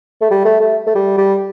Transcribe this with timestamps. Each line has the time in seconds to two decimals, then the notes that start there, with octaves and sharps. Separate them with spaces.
0.22 A3
0.31 G3
0.45 A3
0.60 A3
0.87 A3
0.95 G3
1.18 G3